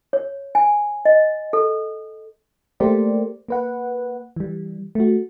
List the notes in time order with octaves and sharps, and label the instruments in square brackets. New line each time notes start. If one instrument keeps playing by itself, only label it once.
[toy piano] C#5
G#5
D#5
A4
[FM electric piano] A3 A#3 G4 A#4 C5 D5
A#3 B4 F#5
E3 G3
A3 F#4